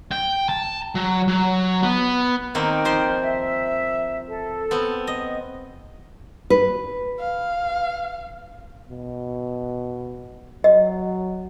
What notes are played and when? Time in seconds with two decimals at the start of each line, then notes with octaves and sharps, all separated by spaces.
0.11 G5
0.49 A5
0.95 F#3
1.28 F#3
1.83 B3
2.55 D#3 A#3 C4 D#4 G5 F6
2.85 F3 C5 C6
3.22 E5
4.27 A4
4.71 B3 C4
5.07 D#5
6.50 B4
7.20 F5
8.90 B2
10.64 F#3 D#5